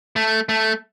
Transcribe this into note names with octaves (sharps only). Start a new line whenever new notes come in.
A3
A3